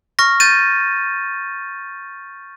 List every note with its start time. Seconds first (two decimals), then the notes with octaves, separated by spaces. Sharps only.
0.19 C#6 F6 A#6
0.40 G6 A6 D#7